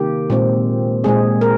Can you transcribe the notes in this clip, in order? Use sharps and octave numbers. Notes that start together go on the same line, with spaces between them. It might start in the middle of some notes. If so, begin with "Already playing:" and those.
Already playing: C3 D#3 A#3 G4
A#2 G#3 C4
A#2 G#3 C4 G#4
A#4